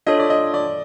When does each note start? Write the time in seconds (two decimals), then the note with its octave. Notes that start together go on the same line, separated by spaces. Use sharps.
0.06 D4 F4 A4 C#5 D#5
0.19 D5
0.30 D#5
0.54 D5